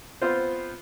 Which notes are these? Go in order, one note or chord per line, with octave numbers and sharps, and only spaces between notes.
B3 C4 F4 C5